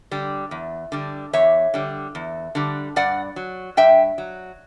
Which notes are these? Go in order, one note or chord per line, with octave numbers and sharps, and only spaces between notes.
D3 G3
E2
D3 G3
E2 C#5 E5
D3 G3
E2
D3 G3
G2 D5 F#5
F#3
G2 E5 G5
F#3